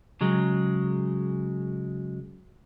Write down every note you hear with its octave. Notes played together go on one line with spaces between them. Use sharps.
C#3 F#3 G#3